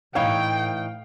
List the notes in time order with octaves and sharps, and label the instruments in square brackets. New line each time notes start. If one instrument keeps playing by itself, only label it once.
[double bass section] A2 [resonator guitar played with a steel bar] E3 D#4 C#5 [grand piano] F5 [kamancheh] G5